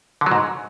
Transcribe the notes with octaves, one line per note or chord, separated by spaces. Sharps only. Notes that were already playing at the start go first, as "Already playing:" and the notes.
D3
F#3
G#2